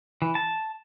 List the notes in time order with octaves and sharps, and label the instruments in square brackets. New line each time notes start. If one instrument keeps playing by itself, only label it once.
[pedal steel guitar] E3
A5